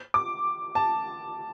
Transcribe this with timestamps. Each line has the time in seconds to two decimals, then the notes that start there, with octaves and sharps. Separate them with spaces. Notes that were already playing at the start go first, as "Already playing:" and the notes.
0.14 D6
0.75 A5